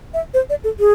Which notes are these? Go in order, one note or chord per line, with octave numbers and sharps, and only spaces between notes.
E5
C5
D5
A4
G#4